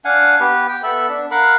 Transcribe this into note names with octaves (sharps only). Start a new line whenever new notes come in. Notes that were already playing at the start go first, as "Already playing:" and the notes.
D4 F5 F#5 G#5
B3 G4 B4
G5
B3 A4 E5 B5
D4
A#4 F5 F#5 B5